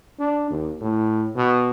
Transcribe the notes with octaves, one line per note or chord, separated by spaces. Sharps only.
D4
D#2
A2
B2